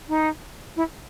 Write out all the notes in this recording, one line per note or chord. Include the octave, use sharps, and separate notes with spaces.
D#4
E4